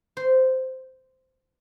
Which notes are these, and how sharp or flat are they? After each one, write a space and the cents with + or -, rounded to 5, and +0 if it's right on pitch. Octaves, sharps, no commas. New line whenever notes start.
C5 -10